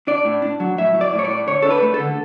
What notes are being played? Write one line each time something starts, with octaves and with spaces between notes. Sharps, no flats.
D4 D5
A2
D4
F#3
A2 E5
F#3
D5
A2
C#5
D5
A2
D3 C#5
D4 A4
B4
A3
A4
D3